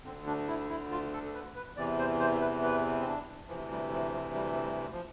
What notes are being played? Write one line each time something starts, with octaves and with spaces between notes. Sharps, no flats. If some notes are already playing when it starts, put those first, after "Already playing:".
D2 D3 C4
D4
E4
E4
F4
A4
B4
B4
E2 C3 E3 D5
C5
C5
B4
B4
C4
D4
D2 C3 E3 F3
G3
F3
F3
G3
G3
F3